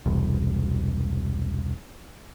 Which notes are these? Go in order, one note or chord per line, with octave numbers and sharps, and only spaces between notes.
E1 C2